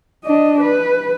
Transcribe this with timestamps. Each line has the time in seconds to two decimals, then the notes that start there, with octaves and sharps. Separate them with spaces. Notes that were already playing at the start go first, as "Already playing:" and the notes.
0.25 D4 D#5
0.60 B4